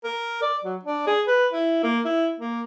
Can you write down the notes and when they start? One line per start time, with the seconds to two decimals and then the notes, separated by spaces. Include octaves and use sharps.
0.04 A#4
0.42 D5
0.64 F#3
0.83 D4
1.07 G#4
1.27 B4
1.53 E4
1.83 A#3
2.05 E4
2.40 A#3